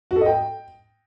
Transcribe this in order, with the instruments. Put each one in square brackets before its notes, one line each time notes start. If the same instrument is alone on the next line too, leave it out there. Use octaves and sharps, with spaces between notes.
[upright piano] F#4
A4
D#5
G5